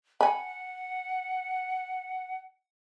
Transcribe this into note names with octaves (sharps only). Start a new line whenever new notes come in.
F#5 G#5 B5